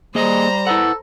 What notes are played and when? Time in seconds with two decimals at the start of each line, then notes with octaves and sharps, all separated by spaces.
0.15 G3 A#3 G#4 C5 D#5 A#5
0.67 E4 A4 B4 F#5